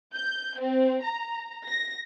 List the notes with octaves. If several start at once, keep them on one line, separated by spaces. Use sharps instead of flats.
G6
C4
A#5
A#6